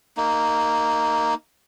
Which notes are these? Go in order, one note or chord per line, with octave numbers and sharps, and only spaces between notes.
A#3 D#4